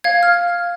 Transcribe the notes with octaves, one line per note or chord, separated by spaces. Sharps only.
F5 G#6
F6